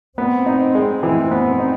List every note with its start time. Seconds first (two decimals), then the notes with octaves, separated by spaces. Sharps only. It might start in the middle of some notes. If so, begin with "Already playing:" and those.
0.18 B3 C4
0.46 D#4
0.75 G#3
1.03 E3 C4
1.31 B3
1.46 C4
1.60 D#4